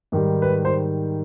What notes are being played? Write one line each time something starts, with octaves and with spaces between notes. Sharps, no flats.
G#2 D#3 G3
B4
C5